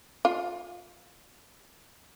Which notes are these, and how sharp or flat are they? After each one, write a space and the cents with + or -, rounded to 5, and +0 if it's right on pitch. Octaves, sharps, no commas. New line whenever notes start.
F4 +25